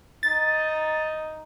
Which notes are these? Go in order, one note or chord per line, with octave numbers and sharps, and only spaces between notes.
D#4 A6